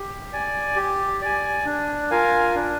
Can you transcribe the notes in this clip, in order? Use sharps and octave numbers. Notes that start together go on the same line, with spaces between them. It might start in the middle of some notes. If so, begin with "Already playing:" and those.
Already playing: G4
D5 G#5
G4
D5 G#5
D4
F4 A#4 F5 G#5
D4